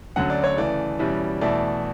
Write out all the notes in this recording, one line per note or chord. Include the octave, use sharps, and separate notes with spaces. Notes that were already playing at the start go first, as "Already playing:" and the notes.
D2 D3 F#3 C#4 F#5
D5
C#5
C#3 E3 A3 D5
E2 B2 G3 C#4 E4
E2 B2 A3 E4 D5